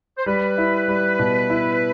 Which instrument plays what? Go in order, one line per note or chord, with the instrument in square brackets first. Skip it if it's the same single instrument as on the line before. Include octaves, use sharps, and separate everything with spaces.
[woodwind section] C5
[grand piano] G3 [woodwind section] B4
[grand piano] E4
G3
B2
E4